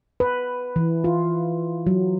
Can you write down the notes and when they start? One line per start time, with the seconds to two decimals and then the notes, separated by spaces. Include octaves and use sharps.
0.20 B4
0.76 E3
1.04 F4
1.87 F#3